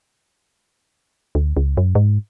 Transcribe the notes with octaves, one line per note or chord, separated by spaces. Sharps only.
D2
C#2
F#2
G#2